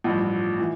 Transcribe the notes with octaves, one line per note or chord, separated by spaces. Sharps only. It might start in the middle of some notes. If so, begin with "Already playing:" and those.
A1 G2 F3
E3